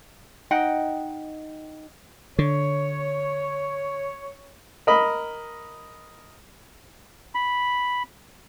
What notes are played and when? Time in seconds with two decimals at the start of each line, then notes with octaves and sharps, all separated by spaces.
0.51 D#4 D#5 F#5 G5
2.39 D3 C#5
4.87 A#4 D#5 B5
7.35 B5